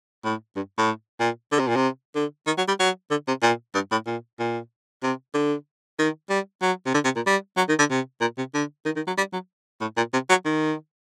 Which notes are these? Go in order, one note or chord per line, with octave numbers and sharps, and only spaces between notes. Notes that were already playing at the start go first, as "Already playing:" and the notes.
A2
G2
A2
A#2
D3
C3
A#2
C3
D3
D#3
F#3
G3
F#3
D3
C3
A#2
G2
A2
A#2
A#2
C3
D3
D#3
G3
F#3
C3
D3
C3
A#2
G3
F#3
D#3
D3
C3
A#2
C3
D3
D#3
D#3
F#3
G3
F#3
A2
A#2
C3
F#3
D#3